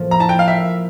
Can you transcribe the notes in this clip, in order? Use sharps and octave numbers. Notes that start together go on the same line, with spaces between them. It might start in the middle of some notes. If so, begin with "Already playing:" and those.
Already playing: A2 F3 A#3
A#5
E4 A5
G5
F5
A#3 E5